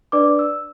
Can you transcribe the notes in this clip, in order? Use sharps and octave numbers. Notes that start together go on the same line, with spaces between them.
D4 B4 D5 D6
E6